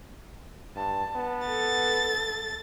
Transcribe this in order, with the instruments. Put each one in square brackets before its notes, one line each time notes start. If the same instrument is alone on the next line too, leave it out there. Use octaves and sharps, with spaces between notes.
[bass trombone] G2 [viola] A5
[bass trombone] B3
[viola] A4 [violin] A6